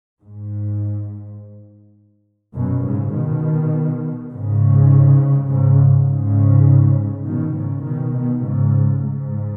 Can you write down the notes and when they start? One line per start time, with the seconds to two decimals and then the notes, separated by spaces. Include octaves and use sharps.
0.22 G#2
2.56 F#2 B2
2.85 G#2 C#3
3.15 B2 D#3
4.32 G#2 C#3
5.49 G#2 C#3
6.08 G#2 C#3
7.25 B2 D#3
7.55 G#2 C#3
7.84 B2 D#3
8.13 B2 D#3
8.42 G#2 C#3
9.02 G#2